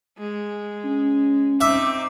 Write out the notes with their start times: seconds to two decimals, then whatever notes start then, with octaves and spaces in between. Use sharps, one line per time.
0.18 G#3
0.84 C#4
1.61 C4 D#4 E5 D6